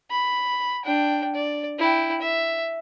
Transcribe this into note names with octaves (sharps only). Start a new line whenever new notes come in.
B5
D4 G5
D5
E4 G5
E5